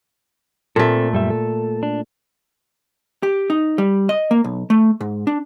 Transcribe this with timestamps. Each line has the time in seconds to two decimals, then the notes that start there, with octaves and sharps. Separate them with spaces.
0.76 A#2 A3 C4 A4
1.13 F#2 G3 E5
1.30 A4
1.83 D4
3.23 G4
3.50 D#4
3.78 G3
4.09 D#5
4.31 A#3
4.44 B1
4.70 A3
5.01 G#2
5.27 D4